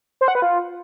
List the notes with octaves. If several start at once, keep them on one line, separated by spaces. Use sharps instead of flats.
C5
F#5
B4
F4